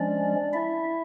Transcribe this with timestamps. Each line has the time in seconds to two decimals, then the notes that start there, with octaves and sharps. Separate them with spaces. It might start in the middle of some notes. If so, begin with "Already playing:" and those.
Already playing: F3 G#3 C#4 D4 D5
0.53 E4 E5